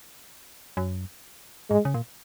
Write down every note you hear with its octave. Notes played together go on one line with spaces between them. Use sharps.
F#2
G#2 G#3
C#3
A#2